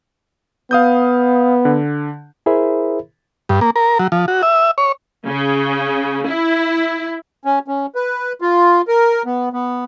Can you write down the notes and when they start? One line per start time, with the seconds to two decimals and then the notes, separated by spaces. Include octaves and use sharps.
0.71 B3 F5 D#6 G6
1.65 D3
2.46 E4 G#4 A#4 C5 E5 B5
3.49 G2
3.61 A#3
3.76 A#4
3.99 F#3
4.12 F3
4.28 F#4
4.43 E5
4.78 C#5
5.27 C#3
6.27 E4
7.45 C#4
7.68 C#4
7.95 B4
8.41 F4
8.88 A#4
9.25 B3
9.53 B3